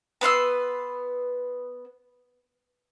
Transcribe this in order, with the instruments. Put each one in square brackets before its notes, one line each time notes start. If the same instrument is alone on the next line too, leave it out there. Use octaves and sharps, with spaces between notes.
[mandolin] B3 B4 C6 E6